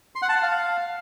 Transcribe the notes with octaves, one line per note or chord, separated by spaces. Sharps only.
C6
F#5
A5
F#5
F5